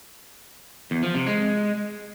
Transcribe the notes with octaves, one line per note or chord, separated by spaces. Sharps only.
E2
F3
C3
G#3